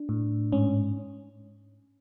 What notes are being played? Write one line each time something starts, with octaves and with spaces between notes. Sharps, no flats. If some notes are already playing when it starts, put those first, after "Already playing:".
Already playing: D4
A2
G#2 C#4